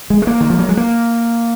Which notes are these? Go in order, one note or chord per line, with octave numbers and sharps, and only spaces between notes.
G#3
G#3
A#3
D#3
F3
F#3
G#3
A#3